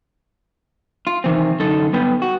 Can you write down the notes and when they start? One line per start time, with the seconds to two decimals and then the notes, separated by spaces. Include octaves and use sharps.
1.07 F4
1.24 C3 D#3 E3 C4
1.60 F#2 D3 D#4 A4
1.93 G2 B3 B4 G5
2.22 F#4